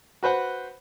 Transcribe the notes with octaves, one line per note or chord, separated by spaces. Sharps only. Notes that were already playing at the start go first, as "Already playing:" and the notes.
F#4 B4 C5 F#5